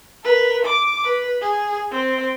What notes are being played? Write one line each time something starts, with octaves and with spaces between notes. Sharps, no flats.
A#4 B4
D6
B4
G#4
C4